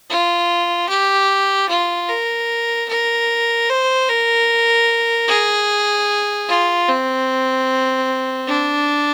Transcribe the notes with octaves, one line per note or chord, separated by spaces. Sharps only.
F4
G4
F4
A#4
A#4
C5
A#4
G#4
F4
C4
D4